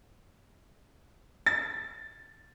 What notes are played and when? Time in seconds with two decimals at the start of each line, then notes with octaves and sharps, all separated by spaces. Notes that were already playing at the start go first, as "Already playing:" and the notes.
1.46 A6